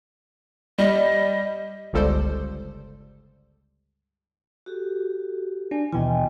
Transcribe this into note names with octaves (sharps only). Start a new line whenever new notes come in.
G3 D#5
G1 C#2 G3 A4 C5 D5
F#4 G4 A4
D4 G#5
D#2 B2 E3 D#5 G5 G#5